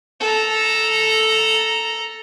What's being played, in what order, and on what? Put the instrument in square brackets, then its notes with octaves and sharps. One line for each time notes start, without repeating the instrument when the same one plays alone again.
[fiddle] A4 A#5